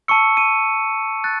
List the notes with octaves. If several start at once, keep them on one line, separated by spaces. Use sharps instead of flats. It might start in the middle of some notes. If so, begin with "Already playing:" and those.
A5 C#6 E6 C#7
D#7
F#6 A6